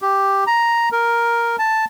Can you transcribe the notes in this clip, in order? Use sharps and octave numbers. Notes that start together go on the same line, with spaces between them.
G4
A#5
A#4
A5